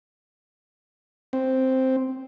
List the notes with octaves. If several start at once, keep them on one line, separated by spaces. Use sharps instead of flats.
C4